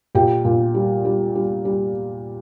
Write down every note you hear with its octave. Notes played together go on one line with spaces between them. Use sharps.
A#2 G4 G5
A#2
G3
G3
G3
G3